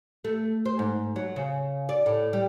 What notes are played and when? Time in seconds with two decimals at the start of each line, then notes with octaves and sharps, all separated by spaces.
0.24 A3
0.66 C5
0.79 G#2
1.16 F#3
1.36 C#3
1.89 D5
2.06 A2
2.33 G3